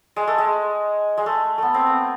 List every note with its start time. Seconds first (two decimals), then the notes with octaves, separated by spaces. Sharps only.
0.16 G#3
0.27 A3
0.38 G#3
1.17 G#3
1.26 A3
1.58 A3 B3
1.74 C4
1.86 B3